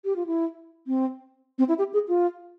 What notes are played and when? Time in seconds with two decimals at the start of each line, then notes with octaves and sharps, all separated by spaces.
0.05 G4
0.16 F4
0.27 E4
0.87 C4
1.58 C4
1.68 E4
1.78 G4
1.93 G#4
2.08 F4